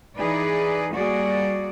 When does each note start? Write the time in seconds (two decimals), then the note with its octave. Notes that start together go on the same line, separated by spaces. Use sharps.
0.17 E3 D#4 G#4 B4 D5
0.95 G3 A#3 F#4 G#4 D5